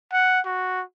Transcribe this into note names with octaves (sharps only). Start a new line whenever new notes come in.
F#5
F#4